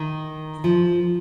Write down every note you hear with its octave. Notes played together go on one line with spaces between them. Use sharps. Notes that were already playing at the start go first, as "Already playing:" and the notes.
Already playing: D#3
F3